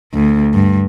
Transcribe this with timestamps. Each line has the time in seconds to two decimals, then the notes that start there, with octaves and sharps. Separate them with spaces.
0.14 D2
0.54 G2